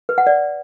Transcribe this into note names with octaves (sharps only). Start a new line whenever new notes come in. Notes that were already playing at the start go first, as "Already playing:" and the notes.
B4
F#5
D5